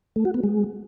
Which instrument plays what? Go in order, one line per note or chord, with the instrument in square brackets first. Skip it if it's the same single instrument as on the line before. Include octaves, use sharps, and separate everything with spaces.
[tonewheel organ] A3
F#4
B3
G#3